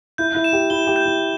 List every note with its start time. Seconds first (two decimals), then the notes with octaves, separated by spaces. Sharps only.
0.18 E4 G6
0.35 E4
0.44 E7
0.53 G4
0.70 E4 G7
0.87 G4
0.96 G6
1.05 E4